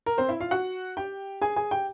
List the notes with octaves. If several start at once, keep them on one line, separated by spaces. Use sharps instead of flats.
A#4
C4 C5
E4 E5
F4 F5
F#4 F#5
G4 G5
G#4 G#5
G#4 G#5
G4 G5